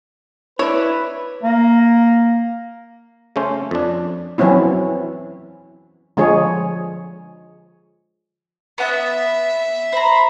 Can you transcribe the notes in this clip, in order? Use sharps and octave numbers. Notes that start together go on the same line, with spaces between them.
D4 E4 B4 C#5
A#3
C#3 A3 C#4 C5
F2 D4
E3 F#3 C4 C#4 E4
D3 F3 G#3 G#4 C#5
B3 E5 F#5
C5 A#5 B5